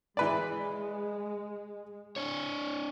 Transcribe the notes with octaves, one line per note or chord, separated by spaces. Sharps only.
E3 G#3 B4 D5
D4 C#5